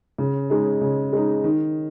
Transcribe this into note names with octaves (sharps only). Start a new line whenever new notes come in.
C#3
G#3 D#4
C#3
G#3 D#4
D#3